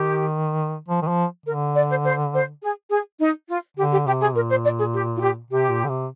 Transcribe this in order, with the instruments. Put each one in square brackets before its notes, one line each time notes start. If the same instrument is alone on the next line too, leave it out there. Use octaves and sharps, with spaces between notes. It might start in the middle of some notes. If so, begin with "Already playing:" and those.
Already playing: [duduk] D#3 [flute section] G4
[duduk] F3
D#3
F3
[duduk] D3 [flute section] A#4
[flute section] D5
C5
C5
C5
G#4
G#4
D#4
F4
[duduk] D3 [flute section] G4
[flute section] G4
[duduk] C3 [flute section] G4
[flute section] G#4
[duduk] A#2 [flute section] A#4
[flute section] C5
D5
G#4
G4
F4
G4
[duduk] C3 [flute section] G4
[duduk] A#2
D3
C3